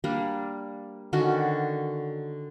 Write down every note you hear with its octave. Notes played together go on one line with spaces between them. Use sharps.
G3 A#3 D4
D3 D#3 C#4 F#4